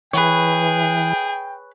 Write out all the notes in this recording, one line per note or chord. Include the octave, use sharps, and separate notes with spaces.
E3 G#4 B4 C#5 G5